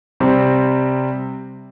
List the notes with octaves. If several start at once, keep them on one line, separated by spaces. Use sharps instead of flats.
C3 G3 C4